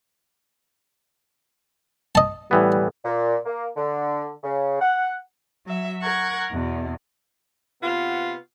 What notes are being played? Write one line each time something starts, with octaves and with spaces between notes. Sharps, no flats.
D#5 A5
A2 E3 G3 B3
A#2
A#3
D3
C#3
F#5
F#3 E5
A#4 F#5 C#6 G#6
E2 B2
C3 B3 F4 F#4 B4